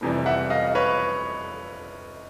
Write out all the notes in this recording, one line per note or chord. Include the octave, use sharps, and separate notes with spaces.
F1 F2 C3 E3 G3
E5 F#5
D#5 F5
B4 C#5